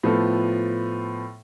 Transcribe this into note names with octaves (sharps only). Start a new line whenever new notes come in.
A2 F3 B3 F4 A4